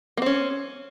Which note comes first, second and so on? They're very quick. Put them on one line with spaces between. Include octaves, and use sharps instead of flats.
A#3 C4 C#4